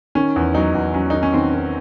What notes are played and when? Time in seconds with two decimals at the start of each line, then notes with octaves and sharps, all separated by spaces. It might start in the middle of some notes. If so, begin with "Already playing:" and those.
0.15 D#3 C#4
0.36 E2
0.55 F#3 D#4
0.75 E2
0.94 F#3 C#4
1.10 D#3 D#4
1.23 C#4
1.34 D#3 C4
1.53 D#3